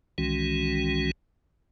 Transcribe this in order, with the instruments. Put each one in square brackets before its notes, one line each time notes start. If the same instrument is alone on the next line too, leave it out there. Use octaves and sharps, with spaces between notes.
[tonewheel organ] C2 D#3 E3 G#3 C#4 F#4